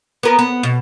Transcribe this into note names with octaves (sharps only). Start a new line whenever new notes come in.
B3 A#4
B3
B2